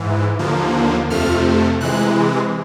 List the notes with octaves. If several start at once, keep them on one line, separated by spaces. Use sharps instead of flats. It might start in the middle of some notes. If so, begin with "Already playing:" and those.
Already playing: G#2 E3
D#2 D3 F3 A#3
F2 C3 F3 A3 F6
C3 E3 G#3 F#6